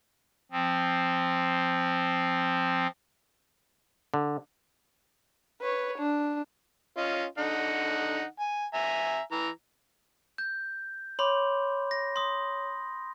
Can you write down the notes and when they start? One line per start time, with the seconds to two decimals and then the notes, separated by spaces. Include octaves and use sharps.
0.52 F3 C4
4.14 D3
5.61 B4 C#5
5.99 D4
6.97 C#4 F4 D#5
7.38 D3 D#4 F#5
8.40 G#5
8.74 E5 G#5 A#5
9.32 E3 A#5
10.38 G6
11.19 C#5 B5 C6 D6
11.91 A#6
12.16 C6 D#6